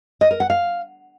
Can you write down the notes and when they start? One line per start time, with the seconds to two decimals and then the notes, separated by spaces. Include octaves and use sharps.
0.21 D#5
0.31 A#4
0.40 F#5
0.50 F5